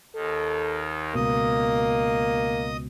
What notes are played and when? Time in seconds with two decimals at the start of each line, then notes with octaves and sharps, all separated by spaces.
0.15 D#2 D#3 A4
1.15 C#2 B2 A#3 D#5 D#6